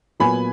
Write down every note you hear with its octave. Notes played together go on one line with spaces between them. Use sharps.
A#2 F#3 B3 G#5 B5